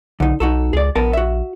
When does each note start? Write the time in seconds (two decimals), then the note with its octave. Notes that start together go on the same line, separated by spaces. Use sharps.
0.20 B1 D3 D#4
0.40 B1 D#4 F#4 A4
0.73 C#2 G#4 D5
0.95 A#1 B3 A#4 A5
1.13 F#4 E5